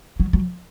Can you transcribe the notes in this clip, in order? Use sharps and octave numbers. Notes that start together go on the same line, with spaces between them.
F#3
F#3